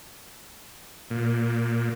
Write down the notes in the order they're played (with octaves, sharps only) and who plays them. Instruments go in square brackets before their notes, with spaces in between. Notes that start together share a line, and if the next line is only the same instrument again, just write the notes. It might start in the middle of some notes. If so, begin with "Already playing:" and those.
[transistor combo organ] A#2